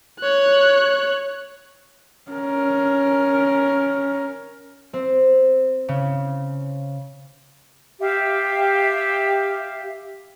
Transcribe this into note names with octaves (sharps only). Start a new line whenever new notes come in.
C#5 F#6
C#4 A#4
C4
C#3
G4 E5 F5